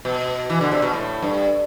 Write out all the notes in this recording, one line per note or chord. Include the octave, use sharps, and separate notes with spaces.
B2
E3
D3
C3
B2
A2
G2